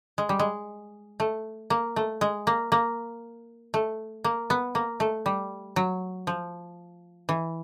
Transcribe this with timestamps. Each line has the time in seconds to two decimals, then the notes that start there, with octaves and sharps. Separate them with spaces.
0.18 G#3
0.29 G3
0.39 G#3
1.20 A3
1.70 A#3
1.96 A3
2.21 G#3
2.47 A#3
2.72 A#3
3.74 A3
4.24 A#3
4.50 B3
4.75 A#3
5.00 A3
5.26 G3
5.76 F#3
6.27 F3
7.29 E3